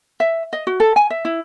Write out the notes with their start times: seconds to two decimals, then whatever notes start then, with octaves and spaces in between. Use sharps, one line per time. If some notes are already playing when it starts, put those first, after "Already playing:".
0.20 E5
0.53 D#5
0.67 F#4
0.80 A4
0.96 G#5
1.10 E5
1.25 E4